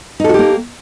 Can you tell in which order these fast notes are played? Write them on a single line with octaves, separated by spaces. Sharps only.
D#4 A4 F#4 G4 A#3